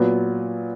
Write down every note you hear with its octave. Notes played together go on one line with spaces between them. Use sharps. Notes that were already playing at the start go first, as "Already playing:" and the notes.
Already playing: A#2 F#3 B3